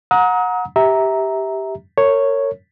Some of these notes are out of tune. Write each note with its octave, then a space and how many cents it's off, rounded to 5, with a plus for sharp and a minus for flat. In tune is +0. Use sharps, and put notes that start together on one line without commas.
F#5 -25 A#5 +15 D#6 +35
G4 +0 E5 -20 A#5 +0
A#4 -35 C#5 +0